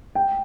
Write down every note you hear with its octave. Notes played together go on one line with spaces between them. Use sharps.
G5